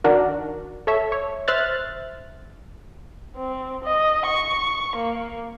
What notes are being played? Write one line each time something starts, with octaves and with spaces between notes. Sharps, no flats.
D#3 D4 F#4 A#4
A4 C#5 E5
C#5
C5 E5 F6 F#6 A6
C4
D#5
C#6
A#3